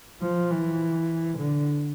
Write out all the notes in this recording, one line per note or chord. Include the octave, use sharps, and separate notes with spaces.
F3
E3
D3